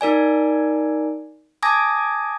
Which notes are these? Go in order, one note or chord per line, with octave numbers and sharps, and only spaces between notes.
D#4 A#4 D5 G#5
G#5 A5 D6 D#6 G#6 A#6